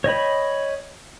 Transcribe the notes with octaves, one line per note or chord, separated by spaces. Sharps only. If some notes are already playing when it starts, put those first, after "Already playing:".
C#5 D#5 G5 B5